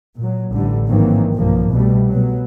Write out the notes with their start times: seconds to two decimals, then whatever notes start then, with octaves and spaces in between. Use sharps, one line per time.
0.18 A#2 F#3
0.54 A1 D3 G3
0.89 G#2 D#3 E3 F#3 A#3 C4
1.35 B1 G2 F3 A#3
1.71 C2 B2 G3 A3
2.10 B2 F#3